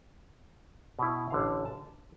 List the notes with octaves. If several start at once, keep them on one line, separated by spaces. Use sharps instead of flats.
B2 E4
A1 D3 F5
A5